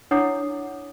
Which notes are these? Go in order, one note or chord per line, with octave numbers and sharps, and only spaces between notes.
D4 E4 C#5 F#5 D6 D#6